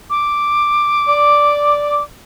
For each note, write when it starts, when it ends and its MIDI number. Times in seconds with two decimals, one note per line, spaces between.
0.10 2.03 86
1.08 2.00 74